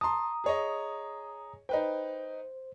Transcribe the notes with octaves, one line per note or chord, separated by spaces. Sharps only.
A5 A#5 C6 D#6
G#4 C#5 D#5
D#4 B4 C5 G5